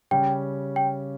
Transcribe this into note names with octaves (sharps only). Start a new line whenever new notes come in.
C#3 G3 C#4 G5
G5